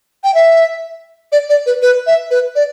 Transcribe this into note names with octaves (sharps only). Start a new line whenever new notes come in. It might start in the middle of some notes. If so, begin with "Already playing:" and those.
G5
E5
D5
D5
B4
B4
E5
B4
D5